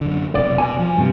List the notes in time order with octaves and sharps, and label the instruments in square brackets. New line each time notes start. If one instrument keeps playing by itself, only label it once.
[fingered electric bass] F#2 D3
[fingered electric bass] F1 B2 [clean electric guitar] D5
[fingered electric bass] B2 [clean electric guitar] G#5
[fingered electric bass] F3
[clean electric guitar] G2 C3